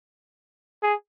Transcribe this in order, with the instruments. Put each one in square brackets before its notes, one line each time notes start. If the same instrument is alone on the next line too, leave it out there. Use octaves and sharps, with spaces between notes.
[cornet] G#4